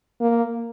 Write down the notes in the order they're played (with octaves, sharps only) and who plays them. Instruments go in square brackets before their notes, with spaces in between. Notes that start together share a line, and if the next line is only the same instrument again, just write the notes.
[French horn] A#3